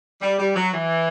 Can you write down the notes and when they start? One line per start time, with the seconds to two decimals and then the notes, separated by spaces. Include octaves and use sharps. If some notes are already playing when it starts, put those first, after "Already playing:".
0.21 G3
0.39 G3
0.55 F#3
0.73 E3